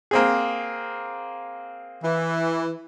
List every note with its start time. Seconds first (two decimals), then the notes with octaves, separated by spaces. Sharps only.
0.11 A#3 C4 G#4
2.03 E3